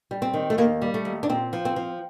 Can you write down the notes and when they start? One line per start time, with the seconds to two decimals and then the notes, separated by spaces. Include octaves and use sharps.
0.11 G3
0.22 C4
0.33 D#3
0.50 A3
0.58 D#2 A#3
0.82 G3
0.94 A3
1.05 D#2
1.23 D4
1.29 A#2 C4
1.53 F3
1.65 C4
1.76 F3